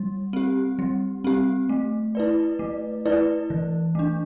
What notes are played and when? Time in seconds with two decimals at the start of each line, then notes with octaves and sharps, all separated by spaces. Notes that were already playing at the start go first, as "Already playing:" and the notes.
Already playing: G3
0.33 C4 G4
0.79 G3
1.24 C4 G4
1.69 A3
2.15 E4 B4 D5
2.59 A3
3.06 E4 B4 D5
3.50 E3
3.95 A3 D4